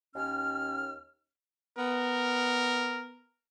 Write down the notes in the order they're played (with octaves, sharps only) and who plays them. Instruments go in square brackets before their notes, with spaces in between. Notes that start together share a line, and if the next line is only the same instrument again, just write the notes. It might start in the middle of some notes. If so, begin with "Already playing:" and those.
[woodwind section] D#2 C#4 F6
[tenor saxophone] B3 [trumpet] A#4